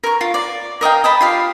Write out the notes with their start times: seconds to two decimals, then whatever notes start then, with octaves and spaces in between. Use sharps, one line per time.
0.03 A#4 C#6
0.21 F4
0.34 D5
0.81 A#4 D#5 F5 G5
1.04 D#5 A5 B5
1.21 F4 G4 F5